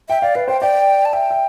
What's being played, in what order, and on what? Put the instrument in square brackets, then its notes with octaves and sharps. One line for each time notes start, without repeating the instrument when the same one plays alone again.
[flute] E5 [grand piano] G5
[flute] D5 [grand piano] F5
[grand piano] B4 [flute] F5
[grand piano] C5 [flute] G5
[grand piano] D5 [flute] G5
[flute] A5
[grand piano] E5 [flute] G5
[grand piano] E5